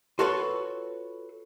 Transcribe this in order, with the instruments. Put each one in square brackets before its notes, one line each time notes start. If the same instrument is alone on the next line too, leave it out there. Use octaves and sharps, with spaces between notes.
[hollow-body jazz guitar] F4 F#4 A4 B4 C#5 C6